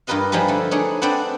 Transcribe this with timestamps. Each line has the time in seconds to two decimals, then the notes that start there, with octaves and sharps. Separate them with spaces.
0.07 G2 F4 A#4 B4 D#5 F5
0.32 F3 G3 D#4 G#4 B4
0.48 D3 A3
0.71 A3 D4 D#4 G#4 C#5
1.02 C4 D4 B4 C5 D5 F#5